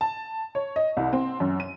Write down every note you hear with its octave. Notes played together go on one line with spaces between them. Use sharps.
A5
C#5
D#5
C2
C4
F#2
D#7